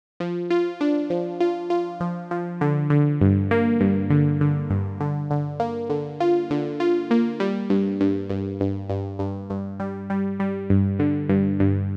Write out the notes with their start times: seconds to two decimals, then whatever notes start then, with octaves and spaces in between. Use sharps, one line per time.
0.20 F3
0.50 F4
0.81 D4
1.10 F3
1.40 F4
1.70 F4
2.00 F3
2.31 F3
2.61 D3
2.90 D3
3.21 G2
3.51 A#3
3.80 G2
4.10 D3
4.41 D3
4.70 G2
5.00 D3
5.31 D3
5.60 A#3
5.90 D3
6.20 F4
6.50 D3
6.80 F4
7.11 A#3
7.40 G3
7.70 G2
8.01 G2
8.30 G2
8.60 G2
8.90 G2
9.19 G2
9.50 G2
9.80 G3
10.10 G3
10.40 G3
10.70 G2
10.99 D3
11.29 G2
11.60 G2